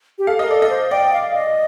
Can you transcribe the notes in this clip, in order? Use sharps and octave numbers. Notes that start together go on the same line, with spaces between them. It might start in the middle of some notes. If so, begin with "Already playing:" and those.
G4
A4 F5
A#4 D#5
A4 D5
D#5
C5
D5 G5
F5
D#5